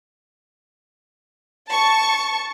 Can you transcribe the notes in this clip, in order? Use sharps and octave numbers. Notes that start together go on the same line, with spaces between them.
A5 C#6